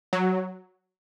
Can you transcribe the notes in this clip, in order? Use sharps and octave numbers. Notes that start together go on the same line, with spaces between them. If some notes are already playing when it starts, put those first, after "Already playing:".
F#3